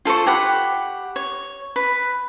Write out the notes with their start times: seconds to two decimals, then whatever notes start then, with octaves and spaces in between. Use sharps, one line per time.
0.05 F4 A4 C5 C#6
0.26 G4 F#5 B5
1.16 C#5
1.76 B4